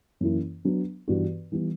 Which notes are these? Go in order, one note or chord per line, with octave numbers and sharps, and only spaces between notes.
F#2 E3 A#3 E4
F#3 B3 D4
G2 E3 B3 F#4
E3 G3 B3